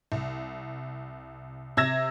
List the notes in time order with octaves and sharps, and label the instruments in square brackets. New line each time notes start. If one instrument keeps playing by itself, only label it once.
[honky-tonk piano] C2
C3 E6 G#6 A#6 E7